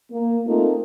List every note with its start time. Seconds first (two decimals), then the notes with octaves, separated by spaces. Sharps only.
0.12 A#3
0.47 A3 A#3 C4 D#4 F4 A#4